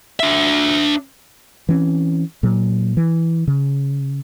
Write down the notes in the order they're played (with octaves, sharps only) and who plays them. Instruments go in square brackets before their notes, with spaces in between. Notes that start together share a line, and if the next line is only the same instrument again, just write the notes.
[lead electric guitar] D4 E5
[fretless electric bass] E3 C4 C#4
A#2 F#3
E3
C#3